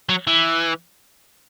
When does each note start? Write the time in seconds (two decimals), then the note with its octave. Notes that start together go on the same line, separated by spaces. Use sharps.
0.09 F#3
0.27 E3